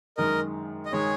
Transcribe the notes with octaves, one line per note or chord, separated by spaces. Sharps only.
F#2 D#3 G#3 A#4 D#5
D#5
D#3 G#3 G#4 C#5